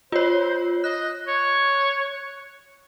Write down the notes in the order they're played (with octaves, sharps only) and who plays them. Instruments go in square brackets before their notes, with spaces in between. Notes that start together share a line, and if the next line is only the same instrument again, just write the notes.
[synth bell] F4 C#5 [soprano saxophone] C5
[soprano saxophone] D#5 [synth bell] F#6
[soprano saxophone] C#5